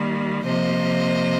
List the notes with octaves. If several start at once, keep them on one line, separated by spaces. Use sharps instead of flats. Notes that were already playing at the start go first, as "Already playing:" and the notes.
Already playing: D#3 G3 A#3
C3 F3 A#3 C5 D#5